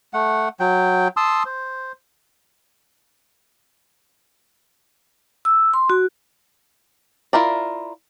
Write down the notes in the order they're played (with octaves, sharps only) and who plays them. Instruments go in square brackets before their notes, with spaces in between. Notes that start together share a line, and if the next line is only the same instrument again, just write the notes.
[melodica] A3 F#5
F#3 G5
A5 C6 D#6 E6
C5
[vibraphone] E6
C6
F#4
[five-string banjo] E4 F4 A#4 D5